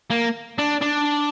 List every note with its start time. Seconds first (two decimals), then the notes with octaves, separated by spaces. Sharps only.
0.11 A#3
0.58 D4
0.81 D4